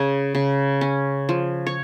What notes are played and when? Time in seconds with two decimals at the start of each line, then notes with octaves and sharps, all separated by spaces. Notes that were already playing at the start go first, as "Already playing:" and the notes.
Already playing: C#3 G#4
0.35 C#3
0.81 C#4
1.29 F3
1.67 C#5